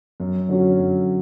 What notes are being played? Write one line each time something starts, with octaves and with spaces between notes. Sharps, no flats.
F#2
D3 F#3 C#4 F#4
F#2